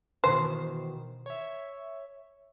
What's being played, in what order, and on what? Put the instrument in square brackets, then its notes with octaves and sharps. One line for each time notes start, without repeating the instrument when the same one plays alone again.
[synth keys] B2 D#3 E3 [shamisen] C5
[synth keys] C#5 E5